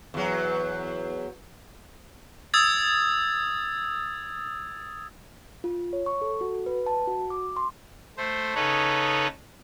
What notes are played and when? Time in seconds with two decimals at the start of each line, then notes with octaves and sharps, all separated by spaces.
0.14 E2 F#3
2.54 D#6 E6 G#6 A6
5.64 F4
5.93 C#5
6.06 C#6
6.22 A4
6.41 F#4
6.66 B4
6.86 A5
7.07 F#4
7.30 D6
7.56 C6
8.18 A3 C5
8.55 C#3 D#4 A4 B4 C#5